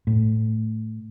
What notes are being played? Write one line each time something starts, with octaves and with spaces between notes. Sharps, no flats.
A2